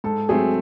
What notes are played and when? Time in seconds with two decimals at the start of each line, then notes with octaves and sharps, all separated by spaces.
0.04 G#2 A4
0.28 F#3 A3 C4 G#4